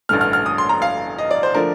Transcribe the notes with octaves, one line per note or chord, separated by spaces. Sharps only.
A1 G2 D3 A3 F6
F6
F6
D#6
C6
A#5
F5
D#5
D5
C5
D3 F3 A3 D4 A#4